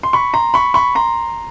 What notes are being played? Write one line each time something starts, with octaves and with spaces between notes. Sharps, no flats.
C6
B5 C#6
A#5 C6
B5 C#6
B5 C#6
A#5 C6